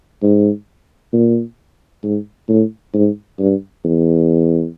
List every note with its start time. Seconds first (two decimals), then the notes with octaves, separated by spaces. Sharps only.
0.22 G#2
1.13 A#2
2.03 G#2
2.48 A2
2.94 G#2
3.39 G2
3.84 E2